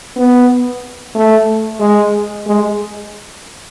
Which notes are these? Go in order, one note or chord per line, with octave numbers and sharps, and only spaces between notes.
B3
A3
G#3
G#3